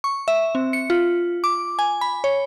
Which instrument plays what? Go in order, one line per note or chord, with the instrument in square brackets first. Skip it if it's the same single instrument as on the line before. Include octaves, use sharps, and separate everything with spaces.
[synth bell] C#6
E5
C4
C#7
F4
D6
G#5
B5
C#5